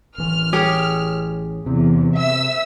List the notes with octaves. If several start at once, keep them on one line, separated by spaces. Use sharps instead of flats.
A1 E3 F6
G4 G#4 C#5
E2 C3
E5 E6